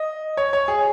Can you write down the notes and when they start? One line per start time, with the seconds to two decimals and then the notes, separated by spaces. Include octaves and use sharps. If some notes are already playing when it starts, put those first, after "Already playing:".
Already playing: D#5
0.37 C#5
0.53 C#5
0.68 G#4